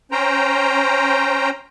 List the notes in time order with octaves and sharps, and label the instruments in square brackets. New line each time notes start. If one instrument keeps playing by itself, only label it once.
[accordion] C#4 C5 G5 A#5